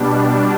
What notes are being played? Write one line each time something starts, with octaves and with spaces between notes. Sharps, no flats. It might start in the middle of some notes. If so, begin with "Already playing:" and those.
Already playing: B2 G3 D4